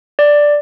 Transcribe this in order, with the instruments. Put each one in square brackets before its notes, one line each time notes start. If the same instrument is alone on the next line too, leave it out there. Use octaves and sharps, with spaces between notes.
[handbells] D5